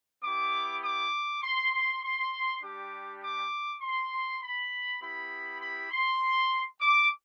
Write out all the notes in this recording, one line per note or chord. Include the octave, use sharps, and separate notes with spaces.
B3 E4 G4 D6
D6
C6
C6
C6
G3 D4 G4 D6
D6
C6
B5
B3 E4 G4 B5
B5
C6
D6